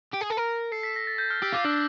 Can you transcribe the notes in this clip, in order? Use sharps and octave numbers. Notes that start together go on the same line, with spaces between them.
G4
G#4
A4
A#4
A4 C7
B6
A#6
A6
G6
F6
G4 E6
F4 D6
D4 E6